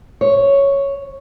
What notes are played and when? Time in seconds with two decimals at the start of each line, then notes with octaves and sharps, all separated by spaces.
0.21 C#5